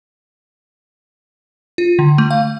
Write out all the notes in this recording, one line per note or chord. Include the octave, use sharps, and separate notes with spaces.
F4
D3
A3
F5